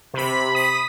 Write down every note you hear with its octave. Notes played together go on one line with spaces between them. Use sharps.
C3 B5
D#6 B6